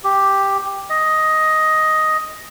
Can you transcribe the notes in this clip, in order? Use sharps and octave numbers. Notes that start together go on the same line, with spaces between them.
G4
D#5